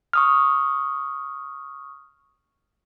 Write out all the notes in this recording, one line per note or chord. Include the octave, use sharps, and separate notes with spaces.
C#6 D#6 F6